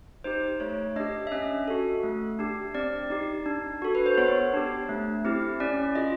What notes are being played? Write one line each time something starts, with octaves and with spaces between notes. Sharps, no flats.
D#4 G4 C5
A3 C#5
D4 G4 D#5
E5
C#4 D#5
F#4 A4
A3
D4 G4
C4 D5
D#4 G4
D4
F#4 A4
B4
C5
B3 C#5
D4 G4
A3
C4 E4 G4
C#4 D5
F4 G#4 D#5